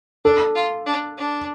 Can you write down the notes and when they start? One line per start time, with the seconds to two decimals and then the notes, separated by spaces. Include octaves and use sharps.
0.25 D4 A4
0.55 F4
0.86 D4
1.17 D4